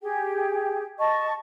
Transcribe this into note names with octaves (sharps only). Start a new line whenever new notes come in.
G4 G#4 G5
D#5 A5 C#6